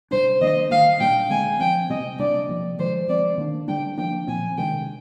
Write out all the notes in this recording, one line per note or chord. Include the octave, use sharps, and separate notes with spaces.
C3 G3 D4 C5
D#3 G3 A#3 D4 D#5
D#3 G3 A#3 F5
A#2 G3 A#3 D4 G5
D3 G#3 C4 G#5
F3 C4 G5
C3 G3 C4 D#5
C3 G3 A#3 D4 D5
C3 F3 A#3
D3 F3 G#3 C5
F3 G#3 C4 D5
D#3 A#3 D4
D3 G3 D4 G5
F3 A#3 D4 G5
A#2 F3 C4 G#5
C3 D#3 G#3 D4 G5